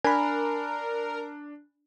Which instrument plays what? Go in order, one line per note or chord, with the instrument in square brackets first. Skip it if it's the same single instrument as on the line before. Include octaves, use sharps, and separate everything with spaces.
[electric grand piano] D4 [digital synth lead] A#4 [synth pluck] G#5 B5